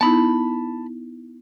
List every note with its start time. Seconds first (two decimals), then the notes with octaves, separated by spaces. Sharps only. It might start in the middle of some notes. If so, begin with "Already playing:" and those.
0.01 B3 D#4 E4 A5 B5